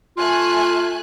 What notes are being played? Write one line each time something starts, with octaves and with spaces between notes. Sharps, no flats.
A3 F4 G#5 F#6